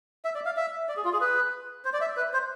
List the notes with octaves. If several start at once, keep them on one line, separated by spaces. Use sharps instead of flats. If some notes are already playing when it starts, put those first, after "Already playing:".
E5
D5
F5
E5
D5
G#4
F4
G#4
B4
C5
D5
E5
B4
C5